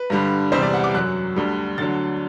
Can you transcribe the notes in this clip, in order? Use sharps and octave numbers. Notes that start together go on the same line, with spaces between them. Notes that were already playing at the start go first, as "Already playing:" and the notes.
Already playing: B4
G2 D3 G3
E2 C3 G3 C5
D5
F#5
D6
F#2 F#3 F#6
D2 D3 G3
D2 D3 F#3 A6